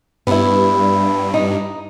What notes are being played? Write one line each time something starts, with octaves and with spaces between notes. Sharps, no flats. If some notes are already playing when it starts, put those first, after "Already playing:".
G2 B3 E4
D#4